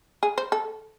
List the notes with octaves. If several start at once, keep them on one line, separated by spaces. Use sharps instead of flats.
G#4
C5
A4